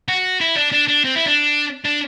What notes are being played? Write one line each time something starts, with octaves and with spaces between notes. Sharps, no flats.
F#4
E4
D4
D4
D4
C4
E4
D4
D4